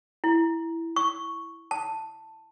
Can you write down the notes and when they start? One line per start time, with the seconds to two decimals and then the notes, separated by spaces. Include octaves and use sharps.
0.24 E4
0.96 C#6
1.71 A5